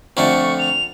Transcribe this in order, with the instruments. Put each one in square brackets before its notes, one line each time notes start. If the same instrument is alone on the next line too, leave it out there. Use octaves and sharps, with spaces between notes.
[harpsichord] F2 D3 A3 [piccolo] C#6
[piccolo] F7